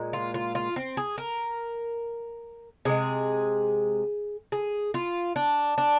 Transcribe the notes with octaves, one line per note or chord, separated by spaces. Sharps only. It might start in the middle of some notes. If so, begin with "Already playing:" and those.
Already playing: A#2 G#3
F4
F4
F4
C4
G#4
A#4
C3 F3 G#3 G#4
G#4
F4
D4
D4